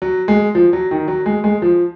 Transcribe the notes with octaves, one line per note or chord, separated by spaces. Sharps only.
F#3
G#3
F3
F#3
D#3
F#3
G#3
G#3
F3